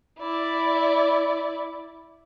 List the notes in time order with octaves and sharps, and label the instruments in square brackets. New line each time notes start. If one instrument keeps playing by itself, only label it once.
[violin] E4 D5